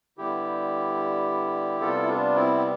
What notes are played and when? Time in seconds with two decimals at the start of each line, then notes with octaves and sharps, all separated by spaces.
0.18 D3 G3 B3 E4 G4
1.81 C3 G3 B3 F4 A4
1.97 E4
2.08 D4 F4
2.35 C4 E4
2.57 C4